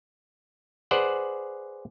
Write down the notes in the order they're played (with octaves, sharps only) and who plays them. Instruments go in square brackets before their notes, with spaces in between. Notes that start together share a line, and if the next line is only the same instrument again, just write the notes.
[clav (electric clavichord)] G#4 B4 C5 D5 F#5